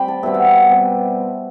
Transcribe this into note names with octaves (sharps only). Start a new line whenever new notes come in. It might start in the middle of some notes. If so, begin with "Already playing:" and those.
Already playing: G3 C4 G5 B5
A5
B2 G3 C4 E5
F#5
E5
B2 G3 C4